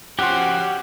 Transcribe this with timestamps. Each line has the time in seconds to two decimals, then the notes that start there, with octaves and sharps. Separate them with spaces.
0.19 F3 C#4 F#4 G4 C#5 F#5 C6